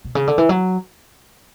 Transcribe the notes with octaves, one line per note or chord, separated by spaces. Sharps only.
B2
C#3
D3
E3
F#3